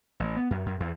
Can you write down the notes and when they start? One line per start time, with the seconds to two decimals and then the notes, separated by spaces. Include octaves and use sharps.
0.20 A1
0.37 B3
0.51 F#2
0.66 F#2
0.80 E2